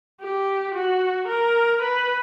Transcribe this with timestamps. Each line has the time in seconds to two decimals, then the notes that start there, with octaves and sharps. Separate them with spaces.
0.20 G4
0.75 F#4
1.28 A#4
1.83 B4